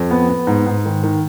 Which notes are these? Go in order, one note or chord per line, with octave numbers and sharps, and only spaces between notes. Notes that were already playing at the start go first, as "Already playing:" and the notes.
Already playing: F2
B3
B3
G#2
G#2
D#3
D#3